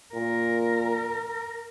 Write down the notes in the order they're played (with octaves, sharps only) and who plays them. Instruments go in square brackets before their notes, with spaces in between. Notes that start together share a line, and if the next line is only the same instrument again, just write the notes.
[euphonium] A#2 [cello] A#4